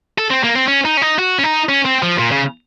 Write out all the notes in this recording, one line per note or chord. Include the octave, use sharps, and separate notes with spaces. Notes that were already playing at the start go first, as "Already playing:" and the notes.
A4
C4
A#3
C4
C#4
D#4
C#4
D#4
F#4
C#4
D#4
C#4
C4
F3
A#2
C#3